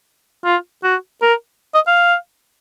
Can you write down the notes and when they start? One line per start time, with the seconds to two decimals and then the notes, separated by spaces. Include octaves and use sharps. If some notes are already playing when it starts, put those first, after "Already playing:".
0.44 F4
0.83 F#4
1.22 A#4
1.74 D#5
1.87 F5